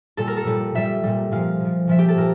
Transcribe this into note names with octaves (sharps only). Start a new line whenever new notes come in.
A#2 G3 A4
A#4
A4
A#2 G3
A#2 G3 E5
A#2 G3
A#2 F3 F5
A#2 F3
A#2 F3 E5
G4
A4
A#2 A#4